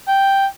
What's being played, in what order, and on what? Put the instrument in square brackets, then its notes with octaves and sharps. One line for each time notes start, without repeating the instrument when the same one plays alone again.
[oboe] G5